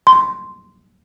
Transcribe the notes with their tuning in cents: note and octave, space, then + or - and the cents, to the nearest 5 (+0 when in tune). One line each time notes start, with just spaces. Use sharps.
C6 -10